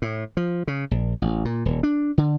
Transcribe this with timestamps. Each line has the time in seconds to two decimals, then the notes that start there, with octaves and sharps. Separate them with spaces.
0.02 A2
0.37 F3
0.67 C#3
0.91 A#1
1.22 A1
1.45 A#2
1.65 D#1
1.83 D4
2.18 D3